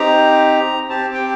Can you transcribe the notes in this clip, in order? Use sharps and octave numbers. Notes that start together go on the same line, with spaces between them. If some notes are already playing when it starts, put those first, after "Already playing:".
Already playing: C4 D#4 G4 A#5
C4 G4 A5
G5